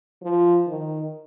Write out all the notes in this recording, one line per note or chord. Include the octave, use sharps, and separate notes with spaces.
F3
D#3